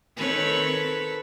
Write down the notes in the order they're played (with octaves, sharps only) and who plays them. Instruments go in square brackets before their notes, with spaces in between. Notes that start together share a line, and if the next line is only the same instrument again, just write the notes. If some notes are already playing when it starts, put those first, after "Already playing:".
[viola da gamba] D#3 C4 C#5 [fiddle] A4 B4